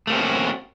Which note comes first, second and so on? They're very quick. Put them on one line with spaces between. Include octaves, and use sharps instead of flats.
A3 A#3 C4 C#4 F#4